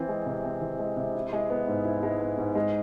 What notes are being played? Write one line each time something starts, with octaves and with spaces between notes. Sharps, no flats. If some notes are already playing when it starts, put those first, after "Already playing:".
Already playing: E3 C4
G#3
C3
C4
E3
G#3
C3
E4
G#3
B3
G#2
E4
G#3
B3
G#2
G#3